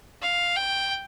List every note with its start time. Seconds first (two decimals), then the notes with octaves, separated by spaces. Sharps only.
0.22 F5
0.56 G5